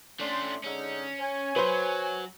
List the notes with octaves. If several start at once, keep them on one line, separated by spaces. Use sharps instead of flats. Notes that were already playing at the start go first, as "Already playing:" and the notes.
A3 C#4 D4 C6
D3 G#3 C#4 D#4
C#5 G#5
F#3 B4 C5